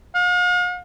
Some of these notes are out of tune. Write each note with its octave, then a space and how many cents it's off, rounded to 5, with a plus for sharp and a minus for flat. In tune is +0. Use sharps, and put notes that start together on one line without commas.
F5 +45